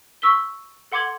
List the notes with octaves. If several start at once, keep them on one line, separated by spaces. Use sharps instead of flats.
C#6 E6 B6 G7
A4 F#5 C6 D6 G#6 F#7